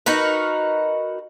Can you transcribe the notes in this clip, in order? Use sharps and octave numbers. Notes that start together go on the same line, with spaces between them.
D#4 F#4 A#4 B4